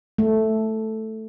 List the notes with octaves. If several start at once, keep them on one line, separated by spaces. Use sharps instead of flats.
A3